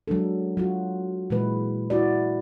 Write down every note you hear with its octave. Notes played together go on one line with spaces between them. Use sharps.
F#3 G#3 D4 A4
F#3 F4 F#4
A#2 E3 G#3 B4
E4 F#4 D5